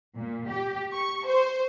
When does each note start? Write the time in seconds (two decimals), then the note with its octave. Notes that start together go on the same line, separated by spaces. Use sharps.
0.17 A#2
0.49 G4
0.92 C#6
1.26 C5